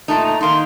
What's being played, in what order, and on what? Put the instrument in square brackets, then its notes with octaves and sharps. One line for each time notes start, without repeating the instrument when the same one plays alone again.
[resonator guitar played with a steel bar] A#2 A3 D#4 [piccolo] A5
[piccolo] A#5
[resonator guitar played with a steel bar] D#3 A#3 D#4 [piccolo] C6